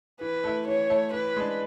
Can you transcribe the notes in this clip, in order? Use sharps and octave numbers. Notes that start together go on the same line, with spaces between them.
E3 B4
A3 E4
E3 C#5
A3 E4
E3 B4
G#3 D4